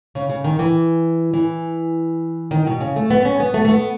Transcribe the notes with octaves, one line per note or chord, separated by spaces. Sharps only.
C#3
C#3
D#3
E3
E3
D#3
B2
C#3
A3
B3
C#4
B3
A3
A3
B3